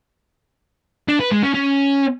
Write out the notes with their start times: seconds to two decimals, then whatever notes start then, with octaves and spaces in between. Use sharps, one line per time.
1.08 D4
1.20 B4
1.31 G#3
1.43 C#4
1.54 C#4